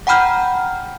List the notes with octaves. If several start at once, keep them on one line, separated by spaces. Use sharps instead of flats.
F#5 G5 A#5 B5 F6 G6